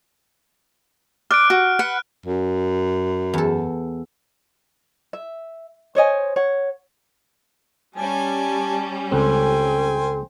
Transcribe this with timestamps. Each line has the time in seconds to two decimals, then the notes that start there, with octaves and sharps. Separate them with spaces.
1.31 D5 F6 F#6 D7
1.50 F#4
1.79 B4 F#5 F#6
2.26 F#2
3.34 E2 A4
5.13 E5
5.95 C5 C#5 D#5 G#5
6.36 C#5 F#5
7.96 G3 C#4 G#5 A5
9.12 C#2 C4 A4 C5 G5 G#5